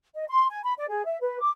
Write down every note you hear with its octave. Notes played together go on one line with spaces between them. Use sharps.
D#5
C6
G#5
B5
D5
G#4
E5
B4
D6